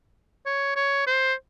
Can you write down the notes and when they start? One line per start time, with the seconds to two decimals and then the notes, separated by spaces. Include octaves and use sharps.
0.46 C#5
0.76 C#5
1.07 C5